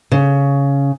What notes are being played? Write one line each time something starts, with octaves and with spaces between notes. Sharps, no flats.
C#3